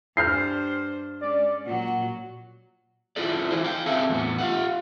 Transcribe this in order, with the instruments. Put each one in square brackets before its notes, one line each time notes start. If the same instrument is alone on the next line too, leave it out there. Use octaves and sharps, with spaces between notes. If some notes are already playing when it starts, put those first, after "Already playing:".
[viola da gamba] G2 D4 C5 [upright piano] F6 G6 C7
[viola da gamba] G#3 C#4 [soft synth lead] D5
[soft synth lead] A#2 [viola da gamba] F#3 F#4
[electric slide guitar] E4 F4 G#4 A4 D5
E3 E4 C5
F5 G5
C4 G#4 A4 E5 G5
E2 A2 B3
F4 F5 F#5